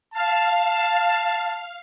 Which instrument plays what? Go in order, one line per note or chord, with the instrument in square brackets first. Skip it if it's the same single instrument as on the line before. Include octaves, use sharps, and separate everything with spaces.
[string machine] F5 [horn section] A5